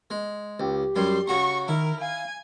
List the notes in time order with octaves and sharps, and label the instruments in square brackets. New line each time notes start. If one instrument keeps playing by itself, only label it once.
[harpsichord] G#3
[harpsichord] C#2 [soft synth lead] G4
[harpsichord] F#2 G3 [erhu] C6
[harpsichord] C#3 F#4 A#5 [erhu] C#6
[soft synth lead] D#3 [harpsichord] E4 [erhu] A#4
[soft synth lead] F5 [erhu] G#5